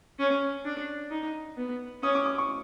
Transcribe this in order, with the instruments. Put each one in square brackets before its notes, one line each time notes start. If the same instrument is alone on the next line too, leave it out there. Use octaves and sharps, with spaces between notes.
[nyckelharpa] C#4
D4
D#4
B3
[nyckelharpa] C#4 [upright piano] D#6
[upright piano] D6
D6
C#6